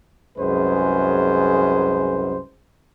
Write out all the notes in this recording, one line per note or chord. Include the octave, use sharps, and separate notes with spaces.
C2 F#2 G#3 G#4 B4 C5